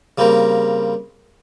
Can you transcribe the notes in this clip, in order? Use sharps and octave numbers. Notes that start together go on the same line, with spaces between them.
C#3 G3 A#3 C4 A#4